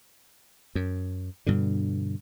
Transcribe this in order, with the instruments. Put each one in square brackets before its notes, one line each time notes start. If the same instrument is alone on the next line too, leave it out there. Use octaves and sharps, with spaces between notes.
[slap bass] F#2
G2 B2 D3